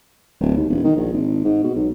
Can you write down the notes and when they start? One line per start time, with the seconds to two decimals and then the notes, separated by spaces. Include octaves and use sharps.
0.41 D1
0.57 D#2
0.70 E1
0.84 D#3
0.97 A#1
1.13 G#1
1.44 G#2
1.64 B2
1.75 B1